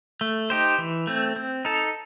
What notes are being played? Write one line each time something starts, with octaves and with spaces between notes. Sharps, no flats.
A3
D#4 G4 C5
E3
A3 C4
C4
D#4 A4